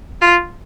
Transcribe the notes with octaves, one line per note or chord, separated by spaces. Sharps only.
F4